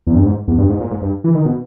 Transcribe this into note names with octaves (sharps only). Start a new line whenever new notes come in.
E2
G2
G#2
E2
G2
G#2
A#2
G#2
G2
E3
D#3
B2